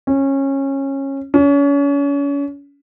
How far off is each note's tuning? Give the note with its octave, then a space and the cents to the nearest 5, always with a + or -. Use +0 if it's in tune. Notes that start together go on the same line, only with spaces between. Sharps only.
C#4 -20
C#4 +35